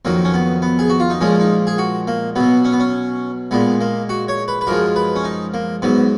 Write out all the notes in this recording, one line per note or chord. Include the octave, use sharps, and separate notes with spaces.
F2 D#3 F#3 A#3
C#4
B3
B3
G#4
F#4
F4
D#4
A#2 F3 G#3 C#4
D#4
G#4
F#4
A#3
B2 F#3 B3
C#4
B3
C#4
A#2 G#3 B3
A#3
F#4
C#5
B4
B4
F#2 F3 G#3 A#4
B4
C#4
D#4
A#3
G#2 F#3 B3